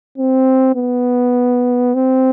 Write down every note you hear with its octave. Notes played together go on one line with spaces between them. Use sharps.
C4
B3
C4